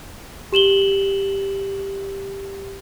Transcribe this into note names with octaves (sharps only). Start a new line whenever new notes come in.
G4 E7 F#7 G7